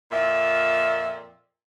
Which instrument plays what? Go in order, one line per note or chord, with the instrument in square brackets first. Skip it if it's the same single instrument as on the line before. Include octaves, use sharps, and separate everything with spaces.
[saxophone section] F2 A#2 E5